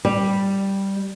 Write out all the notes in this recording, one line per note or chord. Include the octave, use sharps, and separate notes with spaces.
G3